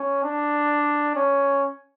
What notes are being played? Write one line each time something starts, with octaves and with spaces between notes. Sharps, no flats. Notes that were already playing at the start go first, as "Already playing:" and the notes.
Already playing: C#4
D4
C#4